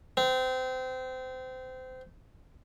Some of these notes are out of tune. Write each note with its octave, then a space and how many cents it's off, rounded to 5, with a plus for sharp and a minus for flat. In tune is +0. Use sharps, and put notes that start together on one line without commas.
C4 -25